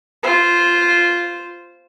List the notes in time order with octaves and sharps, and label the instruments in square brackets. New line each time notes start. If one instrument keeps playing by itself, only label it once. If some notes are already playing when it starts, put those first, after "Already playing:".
[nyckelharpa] F4 C5